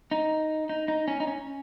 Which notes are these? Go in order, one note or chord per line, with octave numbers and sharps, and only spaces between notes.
D#4
D#4
D#4
C#4
D#4
C#4